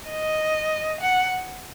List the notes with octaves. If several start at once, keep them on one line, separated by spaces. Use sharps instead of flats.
D#5
F#5